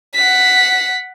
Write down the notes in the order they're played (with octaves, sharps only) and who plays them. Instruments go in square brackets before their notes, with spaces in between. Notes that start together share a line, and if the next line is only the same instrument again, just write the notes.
[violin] F#5 B6